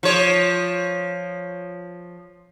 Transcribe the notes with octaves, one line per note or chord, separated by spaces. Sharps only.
F3 C#5